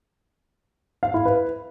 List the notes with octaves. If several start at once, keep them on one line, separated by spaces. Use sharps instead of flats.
F5
E4
B4